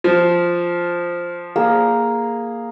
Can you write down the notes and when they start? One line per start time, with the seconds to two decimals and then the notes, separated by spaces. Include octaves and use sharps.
0.04 F3
1.56 A#3 G#4